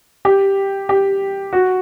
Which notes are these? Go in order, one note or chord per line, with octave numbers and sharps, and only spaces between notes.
G4
G4
F#4